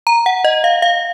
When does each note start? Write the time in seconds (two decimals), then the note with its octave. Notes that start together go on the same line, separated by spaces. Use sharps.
0.07 A#5
0.26 F#5
0.44 D#5
0.64 F5
0.82 F5